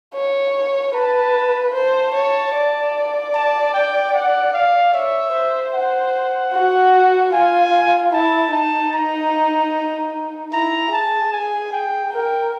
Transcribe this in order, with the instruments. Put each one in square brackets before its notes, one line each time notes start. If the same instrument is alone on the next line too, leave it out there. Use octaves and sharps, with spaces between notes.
[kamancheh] C#5
[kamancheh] B4 [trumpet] A5
[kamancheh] C5 [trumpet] A5
[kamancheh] C#5
D5
[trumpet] A5
G5
F#5
F5
[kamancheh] C#5 [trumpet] E5
[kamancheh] C5
[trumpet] F#5
[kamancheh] F#4
[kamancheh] F4 [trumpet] G#5
[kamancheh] E4 [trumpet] A5
[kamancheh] D#4 [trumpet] A5
[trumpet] A#5
[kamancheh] E4 [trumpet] A#5
[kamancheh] G#4 [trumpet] A5
[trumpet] G#5
G5
[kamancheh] A#4 [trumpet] G5